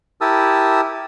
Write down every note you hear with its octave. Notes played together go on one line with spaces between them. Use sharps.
E4 G4 A#4 A5 D#6 E6